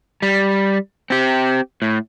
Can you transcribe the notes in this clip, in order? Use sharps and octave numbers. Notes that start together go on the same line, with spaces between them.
G3
C4 G4
A2